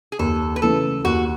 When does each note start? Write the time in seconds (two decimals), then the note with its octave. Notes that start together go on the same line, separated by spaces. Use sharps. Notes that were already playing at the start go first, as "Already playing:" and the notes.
0.12 G#4
0.19 D#2 A4
0.56 B4
0.62 C#3 E3 A3 A4
1.04 D#2 F#4